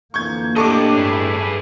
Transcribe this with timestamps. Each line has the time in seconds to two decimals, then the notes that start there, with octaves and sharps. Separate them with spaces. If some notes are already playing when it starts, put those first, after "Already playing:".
0.14 F2 D3 E3 A#3 C#6 G6 G#6
0.56 A2 D4 G4 A4 D#5 C#6 D6
0.96 G2 G#4 B4